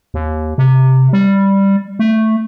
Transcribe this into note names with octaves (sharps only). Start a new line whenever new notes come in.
D#2
C3
G3
A3